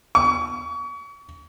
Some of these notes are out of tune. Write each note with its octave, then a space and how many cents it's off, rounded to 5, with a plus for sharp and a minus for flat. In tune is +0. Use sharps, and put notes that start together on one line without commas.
C#6 +35